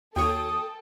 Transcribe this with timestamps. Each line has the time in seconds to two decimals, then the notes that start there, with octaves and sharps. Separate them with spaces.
0.16 D#2 F#4 A4 C#5 G5 D#6